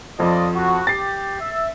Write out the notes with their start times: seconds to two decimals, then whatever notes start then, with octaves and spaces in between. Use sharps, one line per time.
0.19 F2 F3 F4 D5 D#5
0.55 F#4
0.87 G4 A6 C7
1.40 E5